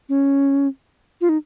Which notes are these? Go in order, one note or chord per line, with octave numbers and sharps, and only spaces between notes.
C#4
F4
D#4